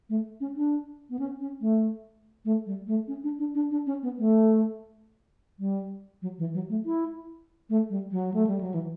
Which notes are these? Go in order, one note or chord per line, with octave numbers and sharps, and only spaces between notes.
A3
C#4
D4
B3
C#4
C#4
A3
A3
G3
A3
C#4
D4
D4
D4
D4
C#4
B3
A3
G3
F#3
E3
F#3
A3
E4
A3
G3
F#3
A3
G3
F#3
E3